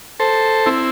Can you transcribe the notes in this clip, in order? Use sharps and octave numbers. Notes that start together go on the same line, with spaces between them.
A4 C5
C4 E4